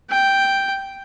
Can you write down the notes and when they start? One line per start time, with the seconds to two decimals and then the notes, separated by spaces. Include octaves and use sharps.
0.10 G5